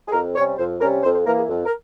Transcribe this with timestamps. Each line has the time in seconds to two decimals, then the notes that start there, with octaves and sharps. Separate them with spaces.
0.08 G#4
0.12 F2 A#4
0.35 C3 G3 C#4 C#5
0.58 F2 C5
0.81 C3 G3 C#4 A#4
1.03 F2 C5
1.15 C5
1.26 E3 A#3 A#4
1.37 G#4
1.49 F2
1.66 A#4